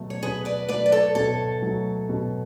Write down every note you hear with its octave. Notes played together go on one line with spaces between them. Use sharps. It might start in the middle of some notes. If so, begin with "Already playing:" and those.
Already playing: B2 F#3 A3
C#5
B2 G#4 B4
B4 D5
F#3 A3 B4 D5
D5
A4 C#5
B2 A4 C#5
F#3 A3
B2